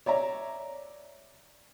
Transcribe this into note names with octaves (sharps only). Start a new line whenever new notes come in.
C#5 D5 E5 A#5